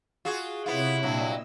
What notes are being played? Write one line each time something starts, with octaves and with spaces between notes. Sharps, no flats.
F4 F#4 G#4
C3 B3 E4 F4 C#5
G2 A#2 F#3 D#5 E6